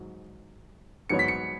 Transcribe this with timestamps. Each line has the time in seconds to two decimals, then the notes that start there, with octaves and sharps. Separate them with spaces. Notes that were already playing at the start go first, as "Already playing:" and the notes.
Already playing: G#2 F#3
1.09 G#2 F#3 B3 F#4 C#5 C#7
1.19 B6
1.28 C#7